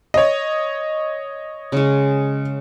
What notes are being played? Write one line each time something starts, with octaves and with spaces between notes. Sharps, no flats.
C#5 D#5
C#3 G#3